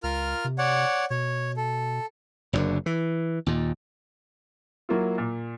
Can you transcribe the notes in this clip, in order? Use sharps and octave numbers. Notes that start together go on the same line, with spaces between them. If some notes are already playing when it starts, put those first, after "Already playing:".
C#2 F4 A#4 F6
C3
C#5 D5 F#5
B2 C#5
A4
F#1 F#2 A#2 D3
E3
D#2 A#2
F#3 A#3 E4 F4
A#2